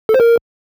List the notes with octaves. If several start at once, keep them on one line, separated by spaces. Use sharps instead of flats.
A4
C5
A#4